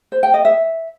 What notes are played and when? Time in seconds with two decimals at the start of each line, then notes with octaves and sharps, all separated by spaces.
0.12 C5
0.23 G5
0.34 D#5
0.45 E5